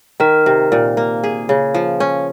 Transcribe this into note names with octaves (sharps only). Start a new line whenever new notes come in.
D#3 A#4
C3
A#2
A#3
G#4
C#3
F3
C#4